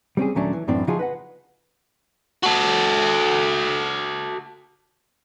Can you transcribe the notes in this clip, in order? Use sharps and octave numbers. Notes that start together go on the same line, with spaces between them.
G3 C4 C#4 G#4
D#2 A#2 F#3 A3 C#4 D4
E3
F#2 A2 E3 C4 D4
C#3 F3 D#4 F4 F#4 G#4
B4 D#5 F#5
F#4 A4